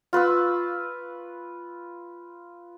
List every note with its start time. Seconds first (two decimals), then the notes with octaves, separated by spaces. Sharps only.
0.13 F4 B4 C#6 E6